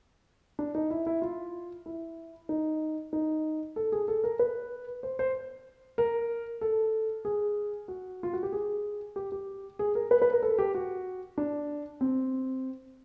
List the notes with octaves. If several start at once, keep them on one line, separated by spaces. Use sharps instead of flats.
D4
D#4
E4
E4
F4
E4
D#4
D#4
A4
G#4
A4
A#4
B4
C5
C5
A#4
A4
G#4
F#4
F4
F#4
G4
G#4
G4
G4
G#4
A#4
B4
B4
A#4
A4
G4
F#4
D4
C4